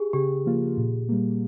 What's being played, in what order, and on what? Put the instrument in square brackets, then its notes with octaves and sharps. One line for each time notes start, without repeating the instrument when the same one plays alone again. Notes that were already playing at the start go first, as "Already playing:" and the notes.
Already playing: [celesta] G4 G#4
[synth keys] C#3 [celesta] G4
[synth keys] F3 A#3 F4
A#2
G3 A#3